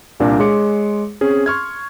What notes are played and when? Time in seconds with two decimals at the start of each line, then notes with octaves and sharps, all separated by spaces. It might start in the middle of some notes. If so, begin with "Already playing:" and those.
0.20 C2 A#2 D4 A#4 D6
0.39 G#3 G#4 C#5 C6 D6 C#7
1.21 C4 C#4 G#4
1.46 C6 C#6 F6 G#6